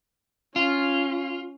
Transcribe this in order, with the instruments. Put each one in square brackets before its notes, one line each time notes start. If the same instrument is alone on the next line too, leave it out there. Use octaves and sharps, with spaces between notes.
[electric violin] C#4 [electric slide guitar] F4